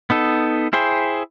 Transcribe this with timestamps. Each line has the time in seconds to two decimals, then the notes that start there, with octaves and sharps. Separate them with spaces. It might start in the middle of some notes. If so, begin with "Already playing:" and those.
0.10 B3 D#4 A4
0.73 E4 G#4 C5 G5